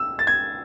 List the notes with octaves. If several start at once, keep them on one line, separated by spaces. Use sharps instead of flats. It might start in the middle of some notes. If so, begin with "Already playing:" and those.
Already playing: E6
A6
G#6